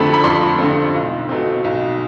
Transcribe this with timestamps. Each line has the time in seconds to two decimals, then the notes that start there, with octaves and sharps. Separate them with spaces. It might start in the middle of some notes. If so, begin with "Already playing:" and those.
Already playing: F2 D3 A3 C4 A5 B5
0.14 B5
0.24 F2 C6
0.58 D3 A3 C4
0.94 B1
1.29 B2 A3 C4
1.64 B1